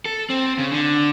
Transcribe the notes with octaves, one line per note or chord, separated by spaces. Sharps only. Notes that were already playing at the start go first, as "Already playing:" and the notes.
A4
C4
C#3
D3